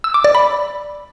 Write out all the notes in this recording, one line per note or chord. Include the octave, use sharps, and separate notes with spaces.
E6
D6
D5
B5